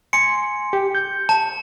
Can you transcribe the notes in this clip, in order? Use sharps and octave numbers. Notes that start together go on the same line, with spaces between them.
G#5 C6 C#7
G4
G6
A5